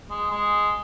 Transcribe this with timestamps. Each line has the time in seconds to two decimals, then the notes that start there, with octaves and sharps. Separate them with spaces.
0.10 G#3
0.31 G#3